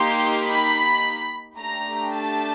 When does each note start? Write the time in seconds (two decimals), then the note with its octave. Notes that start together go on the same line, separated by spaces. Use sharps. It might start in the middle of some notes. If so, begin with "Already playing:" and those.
Already playing: A#3 D#4 G4 C6
0.47 B5
1.58 A3 D4 G4 A#5
2.15 A5